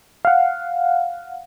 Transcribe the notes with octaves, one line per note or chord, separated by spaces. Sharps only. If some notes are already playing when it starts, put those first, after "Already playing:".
F5 F#5